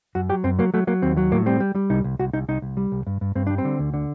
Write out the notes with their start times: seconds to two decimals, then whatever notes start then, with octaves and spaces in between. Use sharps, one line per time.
0.15 F#2 F#4
0.29 F#3 G4
0.44 F#2 C4
0.59 F#3 A#3
0.74 F#3 A3
0.87 F#3 A#3
1.02 D#2 C4
1.17 F#3
1.32 A2 A#3
1.46 G3 C4
1.60 G3
1.75 G3
1.90 C2 D#4
2.04 C2
2.19 C2 F#4
2.33 C2 D#4
2.48 C2 D#4
2.62 C2
2.77 G3
2.92 C2
3.07 G2
3.21 G2
3.35 G2 C4
3.47 G3 D4
3.58 C4
3.65 D3
3.79 D2
3.94 D3